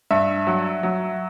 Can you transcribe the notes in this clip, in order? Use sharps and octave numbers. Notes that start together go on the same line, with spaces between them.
G2 E5
F#3
F#3